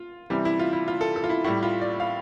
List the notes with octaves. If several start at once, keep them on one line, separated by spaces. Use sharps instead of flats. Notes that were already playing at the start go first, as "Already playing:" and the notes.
Already playing: F4
C3 E3 G3
E4
F4
E4
F4
A4
A4
F4
E4
A2 G3 E4
F4
D5
F5